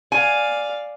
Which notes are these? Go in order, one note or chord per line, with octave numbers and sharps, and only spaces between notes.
D5 F5 G#5